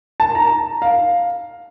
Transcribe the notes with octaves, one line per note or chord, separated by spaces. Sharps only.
A5
A#5
F5